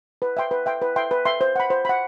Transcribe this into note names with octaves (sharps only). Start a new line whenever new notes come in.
B4
E5 G5 C6
B4
E5 G5 C6
B4
E5 G5 C6
B4
E5 G5 C6
C5
F#5 B5
C5
F#5 B5